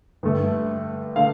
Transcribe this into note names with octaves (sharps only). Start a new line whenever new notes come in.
G2 D3 A3
D3 A3 F5